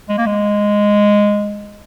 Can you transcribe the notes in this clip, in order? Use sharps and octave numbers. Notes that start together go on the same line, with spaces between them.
G#3
A#3
G#3